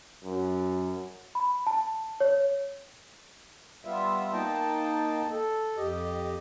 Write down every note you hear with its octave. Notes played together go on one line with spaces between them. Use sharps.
F#2
B5
A5
C#5
G3 B3 F4 E5
A#3 D#4 D#5 G5 A5
A4
F2 G4 D#5